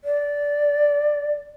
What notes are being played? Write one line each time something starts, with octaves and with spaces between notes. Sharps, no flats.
D5